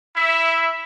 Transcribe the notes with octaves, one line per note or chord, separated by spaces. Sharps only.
E4 E5